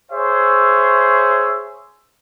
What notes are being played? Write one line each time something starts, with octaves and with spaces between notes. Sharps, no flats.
G#4 C5 C#5 E5